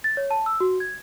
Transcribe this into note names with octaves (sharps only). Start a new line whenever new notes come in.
A6
C#5
A5
E6
F#4
G#6